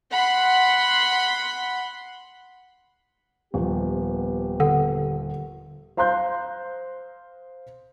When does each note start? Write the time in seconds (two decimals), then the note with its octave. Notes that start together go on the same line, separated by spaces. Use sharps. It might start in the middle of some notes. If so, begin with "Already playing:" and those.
0.12 F#5 B5 C6
3.54 D#1 F3 B3 G4
4.60 D3 A4 F#5
5.97 C5 F5 A#5 C6 F#6 G6